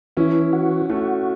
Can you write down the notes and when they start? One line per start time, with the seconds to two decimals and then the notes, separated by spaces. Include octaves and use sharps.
0.17 E3 C#4 E4
0.53 F#4
0.90 A3 C#4 F#4